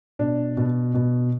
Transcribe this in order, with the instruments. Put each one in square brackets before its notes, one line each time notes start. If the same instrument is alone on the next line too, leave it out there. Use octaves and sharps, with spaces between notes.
[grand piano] B2 D4
B2
B2